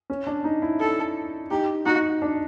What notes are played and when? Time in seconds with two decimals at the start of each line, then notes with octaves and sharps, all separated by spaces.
0.10 C#4
0.27 D4
0.44 D#4
0.62 E4
0.80 A4
1.51 D#4 G4
1.86 D#4 F#4
2.22 D4